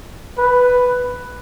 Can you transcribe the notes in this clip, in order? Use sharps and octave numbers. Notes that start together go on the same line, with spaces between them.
B4